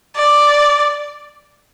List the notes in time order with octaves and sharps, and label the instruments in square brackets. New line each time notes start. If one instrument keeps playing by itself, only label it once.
[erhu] D5